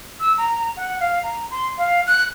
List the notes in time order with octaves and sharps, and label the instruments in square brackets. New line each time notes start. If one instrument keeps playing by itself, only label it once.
[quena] E6
A#5
F#5
F5
A#5
C6
F5
F#6